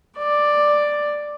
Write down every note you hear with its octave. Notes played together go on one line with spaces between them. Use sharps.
D5